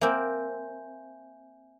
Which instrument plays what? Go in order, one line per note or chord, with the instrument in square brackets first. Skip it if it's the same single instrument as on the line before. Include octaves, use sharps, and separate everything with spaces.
[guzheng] A#3 C4 [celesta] E5 G#5 G6